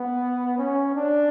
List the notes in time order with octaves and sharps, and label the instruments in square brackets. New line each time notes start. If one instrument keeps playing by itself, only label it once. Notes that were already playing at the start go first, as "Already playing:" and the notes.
Already playing: [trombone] B3
C#4
D4